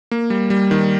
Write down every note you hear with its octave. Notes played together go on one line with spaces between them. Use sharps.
A#3
G3
G3
D#3